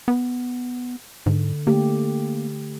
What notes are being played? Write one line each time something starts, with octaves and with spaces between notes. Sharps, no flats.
B3
G#2 D3
D3 A3 A#3 G4